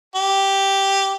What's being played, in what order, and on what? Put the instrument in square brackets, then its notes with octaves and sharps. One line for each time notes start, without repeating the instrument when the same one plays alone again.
[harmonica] G4